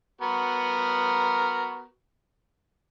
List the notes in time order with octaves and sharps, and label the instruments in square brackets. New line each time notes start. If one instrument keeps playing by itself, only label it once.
[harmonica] B3 F#4 A#4